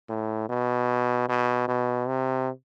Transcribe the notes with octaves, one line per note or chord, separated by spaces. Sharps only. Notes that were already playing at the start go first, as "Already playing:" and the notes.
A2
B2
B2
B2
C3